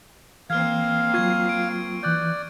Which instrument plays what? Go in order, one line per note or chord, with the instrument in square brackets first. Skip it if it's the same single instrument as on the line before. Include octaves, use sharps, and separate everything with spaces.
[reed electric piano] E3 [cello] A#3 C4 [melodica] F5 [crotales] F6 G#6
[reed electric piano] F#3 F4 [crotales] C#6 G#6
[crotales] D7
[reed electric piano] E3 F#6 G6 [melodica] D5